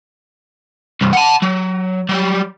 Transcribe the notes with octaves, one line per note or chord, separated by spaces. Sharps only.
C2 G2
F#5 A5
F#3
F#3 G3